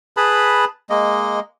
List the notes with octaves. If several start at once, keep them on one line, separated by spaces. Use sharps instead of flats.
G#4 B4 A5 B5
G#3 A#3 D#5